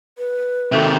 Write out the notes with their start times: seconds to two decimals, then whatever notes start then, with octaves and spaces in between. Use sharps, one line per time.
0.18 B4
0.72 C3 D#3 F#4 A4 E5